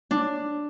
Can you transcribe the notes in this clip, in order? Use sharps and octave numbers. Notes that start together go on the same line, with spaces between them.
D4